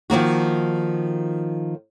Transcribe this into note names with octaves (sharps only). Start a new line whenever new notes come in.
D#3 F3 A#3 F#4